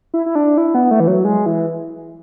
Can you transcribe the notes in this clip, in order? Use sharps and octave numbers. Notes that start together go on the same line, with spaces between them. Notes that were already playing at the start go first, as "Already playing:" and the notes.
E4
E4
D4
E4
B3
A3
E3
F#3
G#3
E3